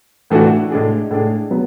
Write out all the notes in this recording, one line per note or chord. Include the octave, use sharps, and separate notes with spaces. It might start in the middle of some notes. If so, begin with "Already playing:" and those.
A2 E3 A3 D4 F#4
A2 G#3 D4 G#4
A2 G#3 D4 G#4
F#3 B3